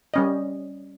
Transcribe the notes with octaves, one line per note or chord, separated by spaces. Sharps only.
G3 C#4 D#5